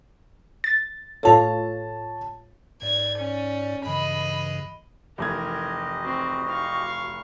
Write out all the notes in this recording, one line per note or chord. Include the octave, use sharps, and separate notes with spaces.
A6
A2 F4 A4 C#5 A5
G#2 D5 G#6
C#4
G2 C#3 E3 D#5 B5
F1 E3 G4 A#4 D#5 G#6
C4 F#4
F5 C#6